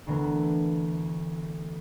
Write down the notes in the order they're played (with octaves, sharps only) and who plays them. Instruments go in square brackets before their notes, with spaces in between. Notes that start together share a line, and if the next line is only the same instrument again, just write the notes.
[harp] D2 D3 E3 B3 A#4